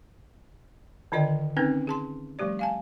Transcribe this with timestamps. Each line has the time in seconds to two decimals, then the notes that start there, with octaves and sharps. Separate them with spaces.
1.12 D3 D#3 F4 D5 D#5 G5
1.57 C4 C#4 D#4 A#4 B4
1.87 G#4 A5 C6
2.39 F3 G3 A3 G4 D5
2.59 F5 G#5 A5